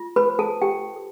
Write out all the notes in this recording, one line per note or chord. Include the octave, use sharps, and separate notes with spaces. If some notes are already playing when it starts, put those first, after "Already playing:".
Already playing: F4
B4 B5
C5
A4 A5
F4 G4 G5
A4